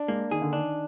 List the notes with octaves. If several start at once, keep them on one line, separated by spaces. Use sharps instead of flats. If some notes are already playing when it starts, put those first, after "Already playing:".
Already playing: D4
G#3 A#3
D#3 G#4
D3
D#3 D4